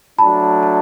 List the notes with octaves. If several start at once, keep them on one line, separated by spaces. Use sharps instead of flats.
F#3 A3 D4 A5 B5
A5